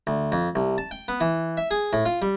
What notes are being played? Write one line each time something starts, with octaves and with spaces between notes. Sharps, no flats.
D2
F2
C2
A5
G5
B3
E3
E5
G#4
A2
F4
G3